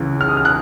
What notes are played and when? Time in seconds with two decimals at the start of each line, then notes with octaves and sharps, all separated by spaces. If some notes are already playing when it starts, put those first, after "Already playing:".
Already playing: C#2 C#3 E3
0.21 F6
0.29 D#6
0.37 F6
0.45 F#6